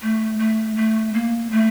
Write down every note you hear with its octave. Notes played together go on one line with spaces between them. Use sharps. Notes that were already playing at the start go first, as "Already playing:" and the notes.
A3
A3
A3
A#3
A3